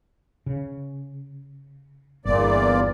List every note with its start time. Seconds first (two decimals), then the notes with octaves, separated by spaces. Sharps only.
0.46 C#3
2.25 G1 E2 A#2 D5